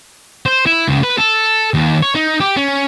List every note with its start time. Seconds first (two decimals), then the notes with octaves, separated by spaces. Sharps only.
0.46 C5
0.66 E4
0.88 C#2
1.03 B4
1.18 A4
1.74 D#2
2.02 C#5
2.15 D#4
2.40 G4
2.57 C#4